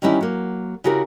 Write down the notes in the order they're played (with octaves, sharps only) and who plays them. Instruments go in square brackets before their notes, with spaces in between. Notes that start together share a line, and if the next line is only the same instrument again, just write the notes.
[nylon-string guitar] D#3 E3 G3 C#4 D#4 E4
F#3 A#3
C#3 E4 F#4 G4 A#4